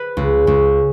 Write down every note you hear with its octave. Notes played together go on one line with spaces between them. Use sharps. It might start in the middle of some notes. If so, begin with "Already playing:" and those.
Already playing: B4
C#2
C#2